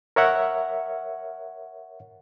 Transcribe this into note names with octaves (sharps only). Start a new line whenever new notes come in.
A#4 C#5 E5 F#5